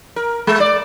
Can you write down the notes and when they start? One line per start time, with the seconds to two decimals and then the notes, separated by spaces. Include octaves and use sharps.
0.16 A#4
0.47 G#3
0.60 D5